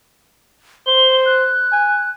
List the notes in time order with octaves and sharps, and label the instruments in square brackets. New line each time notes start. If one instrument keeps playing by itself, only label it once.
[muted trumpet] C5 [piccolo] G7
[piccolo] F#6
[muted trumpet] G#5